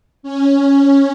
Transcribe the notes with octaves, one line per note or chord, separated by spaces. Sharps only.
C#4